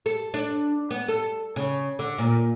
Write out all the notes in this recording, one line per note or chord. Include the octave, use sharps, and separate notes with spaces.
A4
D4
B3
A4
C#3
D3
A#2